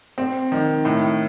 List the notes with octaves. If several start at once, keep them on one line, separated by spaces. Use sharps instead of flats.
C4
D#3
A2